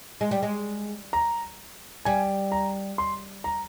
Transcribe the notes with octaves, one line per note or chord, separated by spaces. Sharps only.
G#3
G3
G#3
A#5
G3 G#5
A#5
C6
A#5